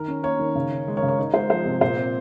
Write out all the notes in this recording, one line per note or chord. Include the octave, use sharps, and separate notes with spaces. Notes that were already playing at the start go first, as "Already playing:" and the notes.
Already playing: D#3 A#4
C#4
A#3 A#4 C#5
D#3
C#3
C#4
G#3
A#4 C#5
C#3
A#4 C#5
D#4 A#4
G#3 C5
F3 C5
C3
A#2 C5
C4